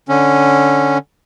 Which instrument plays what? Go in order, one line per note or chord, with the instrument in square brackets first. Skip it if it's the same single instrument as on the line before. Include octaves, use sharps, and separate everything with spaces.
[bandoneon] D3 C#4